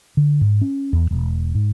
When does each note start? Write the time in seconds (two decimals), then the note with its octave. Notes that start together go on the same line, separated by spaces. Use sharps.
0.17 D3
0.41 G#2
0.61 C#4
0.93 E2
1.11 E1
1.55 G#2